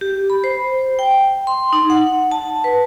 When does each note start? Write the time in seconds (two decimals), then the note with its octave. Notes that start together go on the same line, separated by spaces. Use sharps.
0.01 G4
0.30 B5
0.44 C5
0.99 G5
1.47 C6
1.73 D#4
1.90 F#5
2.31 A5
2.64 B4